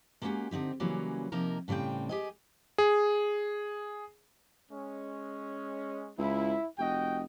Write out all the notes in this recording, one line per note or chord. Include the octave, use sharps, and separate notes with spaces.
G#3 A#3 B3 C#4 F#4 G4
D3 C4 D#4 G4
C#3 E3 F#3 G3 A#3 C#4
C3 F3 A#3 D#4 A#4
A2 C#3 G3 C4 G5
G4 G#4 D#5
G#4
G#3 C#4
C#2 E4
F1 F#4 D#5 G5